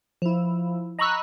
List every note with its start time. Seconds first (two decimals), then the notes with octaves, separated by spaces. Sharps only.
0.22 F3 E4
0.99 D#5 A#5 B5 C#6 E6 F#6